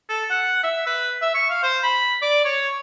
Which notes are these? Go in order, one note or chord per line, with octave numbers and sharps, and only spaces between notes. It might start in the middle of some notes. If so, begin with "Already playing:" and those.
A4
F#5
E5
B4
E5
C#6
F5
C5
B5
D5
C#5